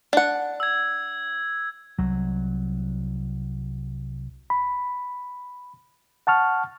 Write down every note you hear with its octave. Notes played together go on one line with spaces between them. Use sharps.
D4 F#5
E6 G#6
C2 F#3
B5
F#5 A5 C#6 F6